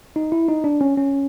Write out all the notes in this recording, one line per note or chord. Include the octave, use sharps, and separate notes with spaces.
D#4
E4
D#4
D4
C#4
C#4